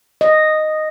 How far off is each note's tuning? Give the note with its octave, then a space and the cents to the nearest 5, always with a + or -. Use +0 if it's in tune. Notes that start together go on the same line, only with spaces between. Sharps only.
D#5 -5